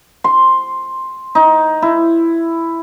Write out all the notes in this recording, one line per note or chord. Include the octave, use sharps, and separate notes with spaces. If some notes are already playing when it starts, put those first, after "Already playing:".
C6
D#4
E4